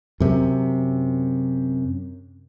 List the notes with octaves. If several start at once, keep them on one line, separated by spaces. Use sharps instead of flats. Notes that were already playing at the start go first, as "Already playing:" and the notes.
F#2 C3